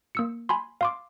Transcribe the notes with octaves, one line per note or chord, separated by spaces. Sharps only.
A#3 E6 C#7
G#5 B5 C6
F5 C6 D6